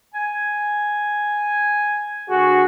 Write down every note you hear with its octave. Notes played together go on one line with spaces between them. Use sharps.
G#5
D2 F#4 G#4